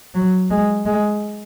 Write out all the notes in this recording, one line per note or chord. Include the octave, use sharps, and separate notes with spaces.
F#3
G#3
G#3